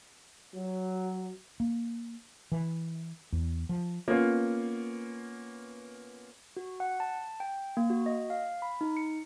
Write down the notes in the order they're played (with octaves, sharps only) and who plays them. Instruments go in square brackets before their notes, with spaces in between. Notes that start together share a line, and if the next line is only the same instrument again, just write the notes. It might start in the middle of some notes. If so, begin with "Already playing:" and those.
[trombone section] F#3
[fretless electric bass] A#3
E3
E2
F3
[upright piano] A#3 B3 C#4 F4
[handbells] F#4
F#5
A5
G5
A#3
F#4
D#5
F5
B5
D#4
C#7